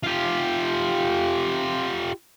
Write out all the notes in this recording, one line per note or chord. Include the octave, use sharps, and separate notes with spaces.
F4 G4